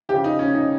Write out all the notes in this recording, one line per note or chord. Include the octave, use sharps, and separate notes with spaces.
C#3 F3 G4
D#4
C#4
D#4